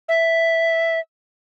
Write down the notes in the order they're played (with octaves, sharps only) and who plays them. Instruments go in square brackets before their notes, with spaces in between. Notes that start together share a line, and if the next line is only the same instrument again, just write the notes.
[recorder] E5